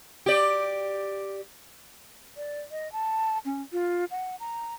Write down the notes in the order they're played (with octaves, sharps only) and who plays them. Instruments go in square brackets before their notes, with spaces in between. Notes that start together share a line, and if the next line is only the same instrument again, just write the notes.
[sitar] G4 D5
[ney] D5
D#5
A5
C#4
F4
F#5
A#5